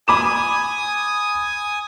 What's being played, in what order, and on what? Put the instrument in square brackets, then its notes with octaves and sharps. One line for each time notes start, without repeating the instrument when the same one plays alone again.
[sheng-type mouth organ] G#5 D#6 [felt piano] B5 D6 E7